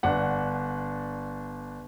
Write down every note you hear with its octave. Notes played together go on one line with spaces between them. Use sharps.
G1 D4 F#5